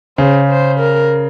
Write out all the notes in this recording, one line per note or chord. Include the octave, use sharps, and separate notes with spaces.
C#3 C5
C5
A#4